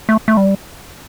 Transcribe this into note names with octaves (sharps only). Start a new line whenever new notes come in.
A3
A3
G3